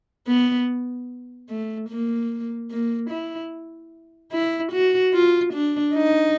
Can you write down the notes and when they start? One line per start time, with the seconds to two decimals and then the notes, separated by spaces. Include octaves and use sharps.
0.28 B3
1.49 A3
1.89 A#3
2.71 A#3
3.10 E4
4.32 E4
4.72 F#4
5.13 F4
5.53 D4
5.93 D#4